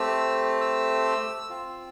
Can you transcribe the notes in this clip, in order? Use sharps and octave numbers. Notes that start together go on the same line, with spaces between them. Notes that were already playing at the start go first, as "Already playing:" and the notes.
Already playing: A3 C4 G4 E6
E6
C4 F4